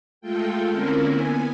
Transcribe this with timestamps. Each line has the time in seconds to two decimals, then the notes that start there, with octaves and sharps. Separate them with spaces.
0.21 G#3 A3 F4 A4 G5
0.70 D3 A#3 C4 C#4 E4 A#4
1.08 B3 G#5